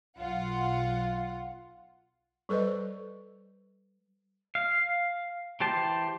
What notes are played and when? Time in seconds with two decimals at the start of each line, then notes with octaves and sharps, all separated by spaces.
0.19 B1 F4 F#5
2.49 G3 A4 B4 C5 D#5
4.55 F5
5.60 E3 G4 C5 A5